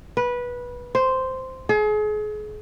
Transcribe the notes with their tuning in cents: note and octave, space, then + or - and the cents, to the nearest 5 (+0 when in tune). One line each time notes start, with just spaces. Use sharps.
B4 -15
C5 -5
G#4 +35